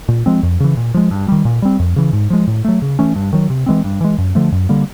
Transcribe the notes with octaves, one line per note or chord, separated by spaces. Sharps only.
A#2
F3 G#3 C4
F2
C#3 E3
A#2
F3 G#3
G2
D#3 G3
A#2
G3 C4
F2
C#3 E3
G#2
F3 G#3
A2
F#3 A3
C#3
E3 A3 C#4
G2
D#3 F#3
C3
E3 G#3 C4
G2
E3 G#3
F#2
D3 F3 A3
F#2
D3 G3 A#3